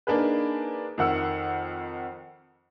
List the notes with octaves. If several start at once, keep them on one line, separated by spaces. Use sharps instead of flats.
A#3 D4 D#4 G#4 B4
F2 D#3 F#5 E6